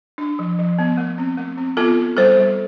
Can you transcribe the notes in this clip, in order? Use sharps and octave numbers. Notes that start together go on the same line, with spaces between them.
D4
F3
F3
B3
A3
C4
A3
C4
B3 F4 A4
B3
G3 A4 C5
G3